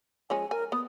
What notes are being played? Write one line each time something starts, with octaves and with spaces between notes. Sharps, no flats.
F3 G#3 C#4 G#5
A#4 G#5
B3 D#6